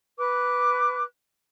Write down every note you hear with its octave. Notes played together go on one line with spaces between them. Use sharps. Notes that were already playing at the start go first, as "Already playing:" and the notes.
B4 D6 F#6